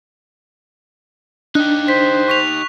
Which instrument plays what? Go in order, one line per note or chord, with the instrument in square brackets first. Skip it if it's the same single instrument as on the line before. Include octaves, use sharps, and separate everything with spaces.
[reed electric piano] D4 [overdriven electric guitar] D#4 G4 [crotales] F#6
[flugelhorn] C5 [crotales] B6
[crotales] C#6 B6 F7